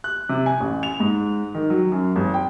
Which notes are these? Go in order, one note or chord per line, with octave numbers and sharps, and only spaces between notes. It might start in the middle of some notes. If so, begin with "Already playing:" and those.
F#6
C3
G#5
A1
F7
G#2
D#3
F#3
F#2
G#1
G5